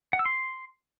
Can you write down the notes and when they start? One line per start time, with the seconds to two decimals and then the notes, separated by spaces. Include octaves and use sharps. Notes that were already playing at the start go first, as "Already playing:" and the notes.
0.13 F#5
0.19 E6
0.26 C6